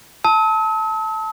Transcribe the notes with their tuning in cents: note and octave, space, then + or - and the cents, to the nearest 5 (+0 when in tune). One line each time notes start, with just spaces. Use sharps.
A5 +0 E6 -45